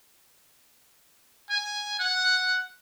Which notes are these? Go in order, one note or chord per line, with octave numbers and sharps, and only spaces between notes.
G#5
F#5